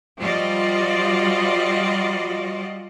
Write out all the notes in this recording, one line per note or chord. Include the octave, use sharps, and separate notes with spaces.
F3 G3 F4 F#4 D5 D#5